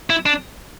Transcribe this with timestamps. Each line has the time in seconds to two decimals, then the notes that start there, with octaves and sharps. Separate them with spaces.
0.10 E4
0.26 D4